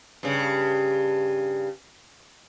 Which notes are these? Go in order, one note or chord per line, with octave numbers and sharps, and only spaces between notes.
G2 C#3